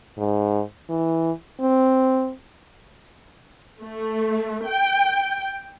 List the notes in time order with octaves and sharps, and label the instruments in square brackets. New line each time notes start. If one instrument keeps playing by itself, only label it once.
[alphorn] G#2
E3
C4
[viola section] A3
G5